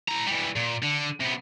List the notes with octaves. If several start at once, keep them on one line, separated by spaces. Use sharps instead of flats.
E4 A#5
E3 G3
A#2
D3
C3 B3